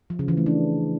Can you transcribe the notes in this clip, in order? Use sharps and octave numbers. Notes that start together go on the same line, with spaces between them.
F3
C#3
E3
A3
D4